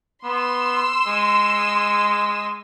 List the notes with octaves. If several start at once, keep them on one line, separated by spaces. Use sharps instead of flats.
B3 C6 E6
G#3